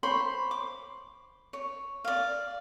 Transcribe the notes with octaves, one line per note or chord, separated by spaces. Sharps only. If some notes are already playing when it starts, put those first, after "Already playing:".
C5 C#5 B5 C6
D6
C#5
D5 F5